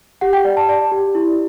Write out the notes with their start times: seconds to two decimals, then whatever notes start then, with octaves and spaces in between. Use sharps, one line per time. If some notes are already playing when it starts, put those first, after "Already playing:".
0.21 G4 F#5
0.33 G5
0.45 D5
0.57 A5
0.69 D5
0.92 G4
1.15 E4